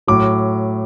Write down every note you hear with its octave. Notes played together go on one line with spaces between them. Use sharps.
A2 F#3 D6